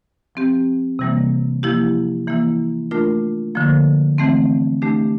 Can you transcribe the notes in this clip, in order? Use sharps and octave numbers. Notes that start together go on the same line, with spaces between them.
F3 C4 G4
C3 E3 G3 A#3
F3 A#3 E4 G4
E3 A#3 E4
A3 D4 F4 A#4
D3 F3 A#3
E3 A3 C4
A3 D4 G4